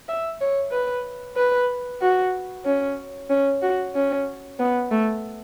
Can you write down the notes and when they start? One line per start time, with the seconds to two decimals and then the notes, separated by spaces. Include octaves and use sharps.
0.09 E5
0.41 C#5
0.72 B4
1.36 B4
2.02 F#4
2.66 C#4
3.30 C#4
3.62 F#4
3.95 C#4
4.59 B3
4.91 A3